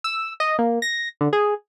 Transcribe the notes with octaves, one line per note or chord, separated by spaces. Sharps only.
E6
D#5
A#3
A#6
D3
G#4